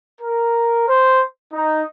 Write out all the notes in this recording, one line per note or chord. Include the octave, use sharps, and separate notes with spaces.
A#4
C5
D#4